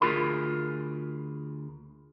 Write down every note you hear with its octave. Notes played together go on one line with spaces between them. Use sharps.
D2 F4 G#4 A#4 B5